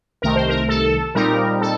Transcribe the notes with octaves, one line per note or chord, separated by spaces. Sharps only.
C2 C3 D#3 A3 A#4
C5
A#4
A4
A#2 G3 C4 D#4 A#4
A4